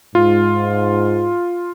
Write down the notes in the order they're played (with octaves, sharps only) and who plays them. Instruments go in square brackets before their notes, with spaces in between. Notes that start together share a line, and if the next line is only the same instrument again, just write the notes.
[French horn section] G#2 [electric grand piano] F4